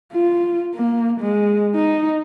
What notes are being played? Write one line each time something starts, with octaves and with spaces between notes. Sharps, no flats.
F4
A#3
G#3
D#4